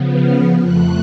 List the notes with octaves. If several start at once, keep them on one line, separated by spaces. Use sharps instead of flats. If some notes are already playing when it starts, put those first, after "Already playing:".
Already playing: C#3 F3 B3
F6
F2 F3 A3 F#6